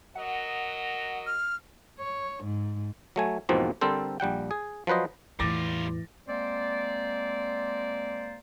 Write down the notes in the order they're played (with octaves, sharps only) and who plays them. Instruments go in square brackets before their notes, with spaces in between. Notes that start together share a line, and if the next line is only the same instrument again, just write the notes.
[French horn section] F#3 A#4 D#5 [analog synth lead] F#5
[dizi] F6
[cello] C#5
G#2
[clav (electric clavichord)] F#3 A3 G#5
E2 G#2 B2 F3 A#3 C4
D3 G3 C4 A4 A#4 C5
A#1 G3 F#5 G5
G#4
F3 F#3 B4 C5 D#5
[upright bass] E2 A2 [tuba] E3 [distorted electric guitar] G3 F4 [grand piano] D6 A6 A#6
[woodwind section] G#3 A#3 C4 C5 D5